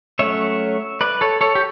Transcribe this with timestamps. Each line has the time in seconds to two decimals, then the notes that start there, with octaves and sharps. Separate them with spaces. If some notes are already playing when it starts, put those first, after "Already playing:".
0.19 F#3 A3 C#4 C#5 E5
1.01 B4 D5
1.21 A4 C#5
1.41 A4 C#5
1.55 G4